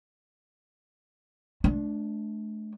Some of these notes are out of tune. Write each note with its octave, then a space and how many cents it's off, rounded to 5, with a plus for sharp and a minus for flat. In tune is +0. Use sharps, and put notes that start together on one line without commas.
A3 -40 D4 +0